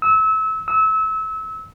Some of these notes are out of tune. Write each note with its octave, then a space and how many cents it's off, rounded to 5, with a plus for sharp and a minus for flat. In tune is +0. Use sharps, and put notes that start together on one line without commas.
E6 -30
E6 -30